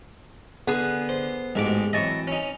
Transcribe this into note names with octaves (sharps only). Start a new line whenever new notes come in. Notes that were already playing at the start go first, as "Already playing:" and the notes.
D3 B3 G#4
C5
A1 G#2 G#3 F#4 G4 D6
E3 F#3 C4 D#5 A5 C#6
C#4 D#4